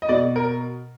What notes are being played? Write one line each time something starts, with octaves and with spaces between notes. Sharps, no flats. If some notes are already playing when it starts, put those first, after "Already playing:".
D#5
B2 D5
A#4